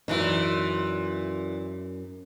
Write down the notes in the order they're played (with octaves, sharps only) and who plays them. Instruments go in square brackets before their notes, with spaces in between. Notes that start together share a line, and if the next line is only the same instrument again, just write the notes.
[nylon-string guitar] F#2 D#4 [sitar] A#2 E3